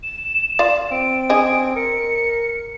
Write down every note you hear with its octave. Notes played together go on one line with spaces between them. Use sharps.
E7
F4 D5 F5
C4 D7
D4 G#4 D#5
A#4 C#7